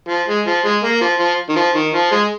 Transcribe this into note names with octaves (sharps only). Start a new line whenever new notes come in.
F3
G#3
F3
G#3
A#3
F3
F3
D#3
F3
D#3
F3
G#3